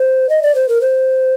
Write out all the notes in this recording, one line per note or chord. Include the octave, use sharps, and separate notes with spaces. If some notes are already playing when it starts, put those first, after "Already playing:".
Already playing: C5
D#5
D5
C5
A#4
C5